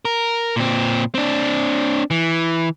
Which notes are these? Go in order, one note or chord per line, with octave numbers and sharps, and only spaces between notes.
A#4
A#2 C4
C4 D4
E3